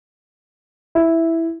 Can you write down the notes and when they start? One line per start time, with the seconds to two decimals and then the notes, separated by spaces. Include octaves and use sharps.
0.95 E4